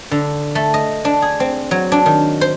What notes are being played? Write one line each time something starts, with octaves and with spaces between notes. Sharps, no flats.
D3
A3
D#5
D4
G#4
C4
F#3
D4
D#3
C5